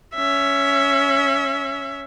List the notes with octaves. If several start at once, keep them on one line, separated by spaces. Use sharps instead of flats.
C#4 E5